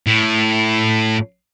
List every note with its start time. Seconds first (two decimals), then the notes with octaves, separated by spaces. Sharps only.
0.07 A2